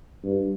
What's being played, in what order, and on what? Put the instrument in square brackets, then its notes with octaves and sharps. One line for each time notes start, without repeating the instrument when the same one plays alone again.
[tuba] G2